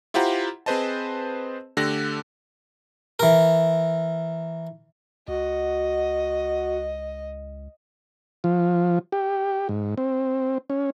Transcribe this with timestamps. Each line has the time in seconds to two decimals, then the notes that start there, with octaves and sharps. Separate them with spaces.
0.14 E4 F4 G4 C5 F#5 A#5
0.66 C4 G#4 B4 C5 D#5 A5
1.77 D3 A3 G4 A4 F#6 A#6
3.19 E3 A#4
5.28 C#2 F#4 D#5
8.44 F3
9.12 G4
9.69 G#2
9.98 C4
10.70 C#4